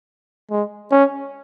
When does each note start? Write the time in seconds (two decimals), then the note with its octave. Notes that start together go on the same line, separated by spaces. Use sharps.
0.51 G#3
0.92 C#4